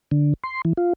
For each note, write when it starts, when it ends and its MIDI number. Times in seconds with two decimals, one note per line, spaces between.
0.11 0.34 50
0.44 0.62 84
0.65 0.73 52
0.77 0.93 65